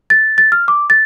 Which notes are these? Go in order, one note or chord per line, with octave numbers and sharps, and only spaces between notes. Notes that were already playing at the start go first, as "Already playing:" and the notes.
A6
A6
F6
D6
A6